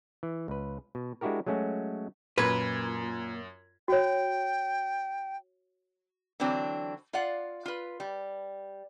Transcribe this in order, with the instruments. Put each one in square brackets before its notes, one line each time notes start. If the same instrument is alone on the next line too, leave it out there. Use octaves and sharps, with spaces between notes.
[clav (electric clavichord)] E3
C#2 B4
B2
G#3 D4 E4 F#4 G4 A#4
F#3 G#3 A3 C#4 F#4
[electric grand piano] F#2 G#6 [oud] A#2 [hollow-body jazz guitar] B4
[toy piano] F#4 C#5 [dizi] G5
[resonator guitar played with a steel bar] D3 E3 F#3 C4 D4
F4 D5 F5 F#5
F4 B4
G3